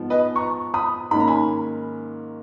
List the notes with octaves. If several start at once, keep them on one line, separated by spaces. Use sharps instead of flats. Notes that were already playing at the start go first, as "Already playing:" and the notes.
Already playing: G#2 F3 B3
B4 D#5
A#5 C#6
B5 D#6
G#2 D#3 A#3 C#4 B5
A#5
G#5 B5